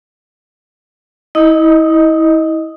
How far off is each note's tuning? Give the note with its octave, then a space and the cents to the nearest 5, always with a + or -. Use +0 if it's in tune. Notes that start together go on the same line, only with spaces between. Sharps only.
E4 -30 D#5 +0 D#6 +0